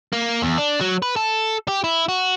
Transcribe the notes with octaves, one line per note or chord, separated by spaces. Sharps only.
A#3
E2
D4
F#3
B4
A4
G4
E4
F#4